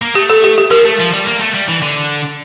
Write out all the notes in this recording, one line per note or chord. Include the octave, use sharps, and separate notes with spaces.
A#3
A3 G4
A4
G4
G4
F3 A#4
A3
F3
G3
A#3
A3
G3
E3
D3